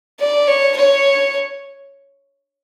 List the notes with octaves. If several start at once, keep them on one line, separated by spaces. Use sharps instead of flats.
D5
C#5
C#5